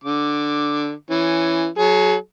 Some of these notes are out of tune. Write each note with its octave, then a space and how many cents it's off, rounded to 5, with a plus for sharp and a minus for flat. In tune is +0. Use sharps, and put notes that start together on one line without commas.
D3 +5 D6 +0
E3 +10 C#4 +0
F#3 +0 G#4 +40